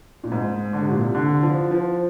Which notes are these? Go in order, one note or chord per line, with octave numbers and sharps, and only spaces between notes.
A#2
G#2
D3
C3
A#2
C3
D3
F3
F3